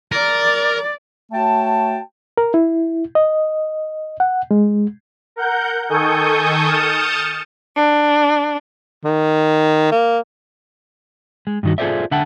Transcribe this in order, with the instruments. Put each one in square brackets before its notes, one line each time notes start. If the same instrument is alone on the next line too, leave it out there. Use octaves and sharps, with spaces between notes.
[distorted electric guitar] A#4 [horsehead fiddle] D5
[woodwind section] A3 F#4 C#5 G5 A5
[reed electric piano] A#4
E4
D#5
F#5
G#3
[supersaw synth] A#4 F#5 G6
D#3 A4 G#5 C#6 D#6 G6
D#6 F6 G6 A6 C#7 E7
[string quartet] D4
[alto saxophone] D#3
A#3
[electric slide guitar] G#3
G2 D#3 F#4
F4 G#4 A4 C5 D5 E5
D3 E5 F#5 G5 A5